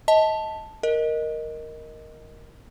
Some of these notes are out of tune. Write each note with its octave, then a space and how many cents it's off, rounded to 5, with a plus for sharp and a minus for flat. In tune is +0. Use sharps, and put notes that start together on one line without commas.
D#5 +25 A5 +0
A#4 +0 D#5 +0